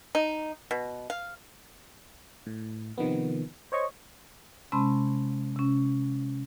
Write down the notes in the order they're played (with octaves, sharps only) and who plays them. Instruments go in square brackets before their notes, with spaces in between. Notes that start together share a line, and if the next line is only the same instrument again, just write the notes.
[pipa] D#4
B2
F5
[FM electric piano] A2
C3 D#3 F3 B3
C5 C#5 D#5 C#6
[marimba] C3 G#3 C#4 A5 B5 C6
C3 C#4